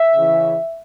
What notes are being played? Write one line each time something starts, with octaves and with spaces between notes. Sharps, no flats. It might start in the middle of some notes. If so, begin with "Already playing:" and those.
Already playing: E5
C#3 E3